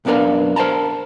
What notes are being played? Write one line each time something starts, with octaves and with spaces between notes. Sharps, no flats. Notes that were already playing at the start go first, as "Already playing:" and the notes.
B1 F#2 B3 D4 A#4 F5
A#4 C5 F#5 A5 A#5